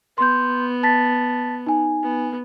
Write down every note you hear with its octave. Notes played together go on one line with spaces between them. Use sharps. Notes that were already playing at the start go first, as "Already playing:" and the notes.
B3 C6 G6
A5 A6 B6
D#4 G#5
B3